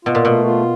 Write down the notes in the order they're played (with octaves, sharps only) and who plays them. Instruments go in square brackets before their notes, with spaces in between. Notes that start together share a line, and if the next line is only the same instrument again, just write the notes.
[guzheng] B2 [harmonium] F4
[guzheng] A#2
[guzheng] B2 [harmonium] A3
[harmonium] F4